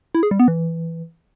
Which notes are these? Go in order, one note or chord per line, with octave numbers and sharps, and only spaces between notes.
E4
G#4
G3
B3
E3